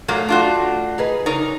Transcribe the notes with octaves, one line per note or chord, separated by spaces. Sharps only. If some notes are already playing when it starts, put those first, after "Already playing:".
A#2 F#3 A3 A#3
D4 F4 F#4
D#4 G#4 B4
C#3 D4 D#4 A#4 C#5